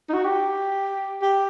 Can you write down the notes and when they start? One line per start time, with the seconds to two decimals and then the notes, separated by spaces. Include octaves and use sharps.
0.09 D#4
0.13 F#4
0.25 G4
1.22 G4